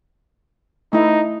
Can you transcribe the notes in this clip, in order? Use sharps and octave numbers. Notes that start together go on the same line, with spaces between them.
A3 D#4 E4